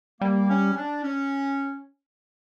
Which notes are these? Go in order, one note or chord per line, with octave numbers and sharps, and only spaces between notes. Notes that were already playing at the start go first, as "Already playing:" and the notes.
G3 A#3
C#4
D4
C#4